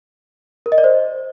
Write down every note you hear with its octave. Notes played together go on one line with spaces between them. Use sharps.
A#4
D#5
D5
C5